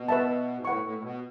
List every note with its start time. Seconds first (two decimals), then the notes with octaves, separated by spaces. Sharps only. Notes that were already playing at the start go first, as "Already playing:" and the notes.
Already playing: B2
0.08 B4 E5 A5
0.58 G#2
0.65 A2 B4 F#5 C#6
0.83 A2
0.98 A2
1.03 B2